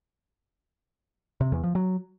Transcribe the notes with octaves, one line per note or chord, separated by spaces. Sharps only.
C3
E2
F3
F#3